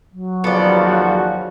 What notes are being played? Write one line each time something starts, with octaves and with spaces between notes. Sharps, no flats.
F#3
D#2 C#3 F3 B3 A4 D5
F#4